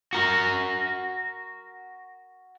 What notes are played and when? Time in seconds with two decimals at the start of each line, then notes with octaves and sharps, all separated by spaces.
0.13 F#4 A#4